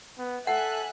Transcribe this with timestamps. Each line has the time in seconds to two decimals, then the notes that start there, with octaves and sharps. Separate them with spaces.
0.18 B3
0.47 A4 E5 F#5 G#5 F#6